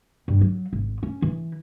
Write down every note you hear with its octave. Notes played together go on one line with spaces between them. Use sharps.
G2
F#3
G#1
C#4
E3